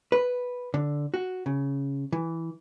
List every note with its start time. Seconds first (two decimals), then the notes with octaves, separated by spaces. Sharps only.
0.12 B4
0.74 D3
1.14 F#4
1.46 C#3
2.12 E3